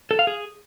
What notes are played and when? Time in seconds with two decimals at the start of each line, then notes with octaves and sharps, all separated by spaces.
0.11 A4
0.19 F5
0.27 G#4